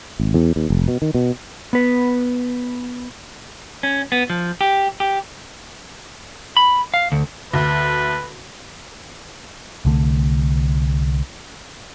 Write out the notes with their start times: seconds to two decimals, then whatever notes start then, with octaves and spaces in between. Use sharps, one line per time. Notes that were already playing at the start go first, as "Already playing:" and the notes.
0.20 G#1
0.34 E2
0.56 D#2
0.70 F1
0.88 B2
1.02 D#3
1.14 B2
1.73 B3 B4
3.83 C#4
4.12 B3
4.30 F3
4.61 G4
5.00 G4
6.57 B5
6.94 F5
7.12 D2
7.53 D2 B4
9.85 C2 D3 A3